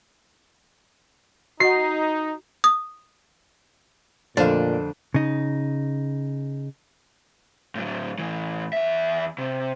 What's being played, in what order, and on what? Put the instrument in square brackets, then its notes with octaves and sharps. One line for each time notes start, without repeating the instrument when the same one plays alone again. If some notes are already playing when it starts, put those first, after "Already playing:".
[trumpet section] D#4 [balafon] F#4 D#5 F#5 [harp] C7
[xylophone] D#6
[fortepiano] F2 A3 C5 [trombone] A#2 [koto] D3 D4 [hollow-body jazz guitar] D5 F5
[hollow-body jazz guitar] C#3 D#4
[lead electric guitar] A2 F#3
A2 E3
E2 E5
C3